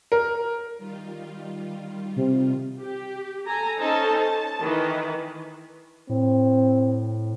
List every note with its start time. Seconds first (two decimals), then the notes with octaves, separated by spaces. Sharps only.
0.12 A#4
0.78 D#3 G3 F4
2.16 C3
2.80 G4
3.46 A4 G#5 A#5
3.80 C#4 D#4 A4 C5 A5
4.24 A5
4.62 D#3 E3 B4
6.09 A2 C4